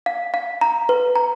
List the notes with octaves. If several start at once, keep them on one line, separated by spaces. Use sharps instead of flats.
F5
F5
A#5
B4
A#5